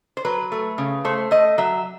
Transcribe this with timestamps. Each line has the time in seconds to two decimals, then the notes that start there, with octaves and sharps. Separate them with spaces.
0.17 C5
0.25 F#3 B4
0.52 A3
0.78 C#3
1.05 A3 C5
1.31 A3 D#5
1.58 F#3 E5